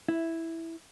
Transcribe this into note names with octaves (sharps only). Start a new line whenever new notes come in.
E4